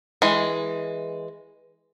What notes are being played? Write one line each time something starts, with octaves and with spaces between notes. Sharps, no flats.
E3 G#3